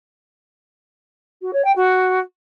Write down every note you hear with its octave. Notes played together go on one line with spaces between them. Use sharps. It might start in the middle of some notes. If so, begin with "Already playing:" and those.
F#4
C#5
G5
F#4